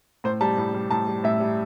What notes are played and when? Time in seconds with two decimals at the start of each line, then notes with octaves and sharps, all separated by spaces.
0.24 A2 C5
0.41 G3 A5
0.58 A2
0.75 G3
0.91 A2 A5
1.07 G3
1.24 A2 E5
1.40 G3